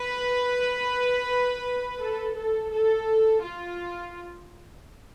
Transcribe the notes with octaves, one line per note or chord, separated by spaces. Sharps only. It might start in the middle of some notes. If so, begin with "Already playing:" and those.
Already playing: B4
A4
A4
A4
F4